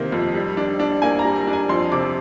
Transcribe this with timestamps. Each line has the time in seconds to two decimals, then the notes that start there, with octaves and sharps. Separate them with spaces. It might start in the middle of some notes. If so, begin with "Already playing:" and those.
Already playing: C3 D#3 A#3
0.12 F2
0.35 G3
0.57 D4
0.80 D4
1.02 A#3 G#5
1.19 A#5
1.25 G3
1.36 A#5
1.47 D4
1.53 G#5
1.69 F2 C6
1.92 C3 D6